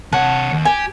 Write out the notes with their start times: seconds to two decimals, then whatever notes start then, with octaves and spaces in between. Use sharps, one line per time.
0.12 C3 C#5 F#5 A5
0.52 D#2
0.65 G4 G#5